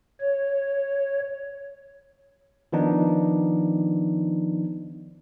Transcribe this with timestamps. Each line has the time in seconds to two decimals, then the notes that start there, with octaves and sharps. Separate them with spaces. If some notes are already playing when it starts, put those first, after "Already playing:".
0.20 C#5
2.72 D#3 F3 B3 D4 D#4